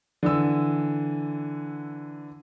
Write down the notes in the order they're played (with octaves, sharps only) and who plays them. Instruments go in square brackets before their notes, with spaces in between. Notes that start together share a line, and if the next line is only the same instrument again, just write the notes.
[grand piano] D3 E3 E6